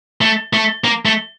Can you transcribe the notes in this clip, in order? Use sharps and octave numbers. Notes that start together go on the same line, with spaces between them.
A3
A3
A#3
A3